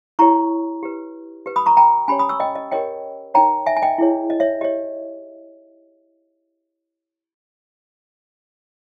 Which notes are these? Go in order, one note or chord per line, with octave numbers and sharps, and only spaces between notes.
E4 G4 C#5 A#5 C#6
G4 B4
G4 B4
B5 D#6
A#5 C#6
G5 A#5
C#4 G4 C#5 G#5 B5
B5 D#6
C#6 E6
D#5 G5
D#5
G4 A#4 C#5 D#5 G5
D#4 A#4 C#5 G5 A#5
E5 G#5
G#5
D#5 G5
E4 G#4 C#5
D#5
C#5 E5
G4 C#5 D#5